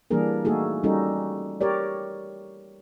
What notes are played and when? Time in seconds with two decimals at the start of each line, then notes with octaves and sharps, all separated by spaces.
0.11 E3 G3 A#3 D4 G#4 A#4
0.45 A3 A#3 D#4 F#4 G#4 A4
0.83 G3 C#4 D#4 F#4 A4
1.61 G4 A#4 C#5 D5